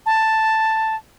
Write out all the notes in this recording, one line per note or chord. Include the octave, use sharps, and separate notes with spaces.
A5